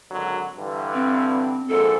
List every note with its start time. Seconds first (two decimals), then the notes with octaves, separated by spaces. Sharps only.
0.10 G#1 D3 F#3
0.56 G2 D3 E3
0.94 C4
1.68 A#1 G#2 A4